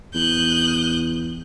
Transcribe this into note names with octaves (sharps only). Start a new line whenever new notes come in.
E2 D#6 F#6 G6